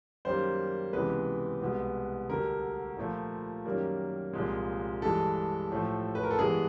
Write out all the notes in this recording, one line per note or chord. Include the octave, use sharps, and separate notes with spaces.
F#2 D#3 G3 A#3 C5
C#2 C3 E3 G#3 B3 B4
C2 B2 G#3 B3
D2 D3 G3 A#4
A#2 F3 A3
F#2 D#3 G3 A#3
C2 A#2 F3 G#3
G2 E3 G#3 A4
A2 F3 A3
B4
A#4
A4
G2 E3 G#3 B3 G#4